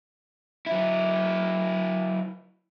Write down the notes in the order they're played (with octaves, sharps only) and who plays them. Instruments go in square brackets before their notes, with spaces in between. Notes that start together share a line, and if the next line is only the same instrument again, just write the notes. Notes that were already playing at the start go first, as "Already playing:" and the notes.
[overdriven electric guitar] F#3 E4